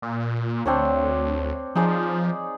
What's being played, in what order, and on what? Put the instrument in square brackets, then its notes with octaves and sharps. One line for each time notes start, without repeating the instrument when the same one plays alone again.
[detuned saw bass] A#2
[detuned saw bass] D2 [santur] C4 D4 C#5
[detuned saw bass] F3 [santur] D#4 G#4 D5